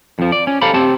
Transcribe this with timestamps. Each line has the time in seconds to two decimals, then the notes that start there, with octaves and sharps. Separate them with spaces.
0.19 F2 F3
0.32 D5
0.47 C#4
0.62 G4 A4 C5 F5 A#5 B5
0.74 C4 G4 A5